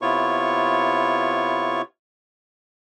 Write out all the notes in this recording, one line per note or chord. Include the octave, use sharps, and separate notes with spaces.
C3 B3 E4 F4 C#5 C#6